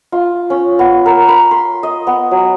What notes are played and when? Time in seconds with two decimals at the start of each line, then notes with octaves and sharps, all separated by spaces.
0.12 F4
0.50 C#4
0.79 B3
1.06 A#4
1.28 B5
1.51 C6
1.83 D#5
2.07 B3
2.31 F#3